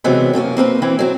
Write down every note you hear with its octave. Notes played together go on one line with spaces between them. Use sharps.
C3 E3 F#3 G#3 B3 C4
F#2 C3 A#3 C#4
A#3 C4 A#4 B4
E3 C4 E4
F#3 C4